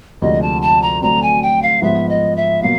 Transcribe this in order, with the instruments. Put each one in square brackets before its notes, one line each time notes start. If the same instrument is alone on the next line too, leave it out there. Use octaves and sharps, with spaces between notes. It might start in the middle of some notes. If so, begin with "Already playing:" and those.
[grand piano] D2 C3 F3 G#3 [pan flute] D#5
[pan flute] A5
A5
A#5
[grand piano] D3 F#3 A3 C4 [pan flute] A#5
[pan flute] G#5
G5
F5
[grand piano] G#2 F3 G#3 B3 [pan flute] E5
[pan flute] D#5
E5
[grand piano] B2 F#3 A#3 [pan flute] F5